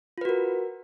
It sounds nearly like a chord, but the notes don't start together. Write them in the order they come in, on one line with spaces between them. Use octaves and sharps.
F4 B4 F#4 A#4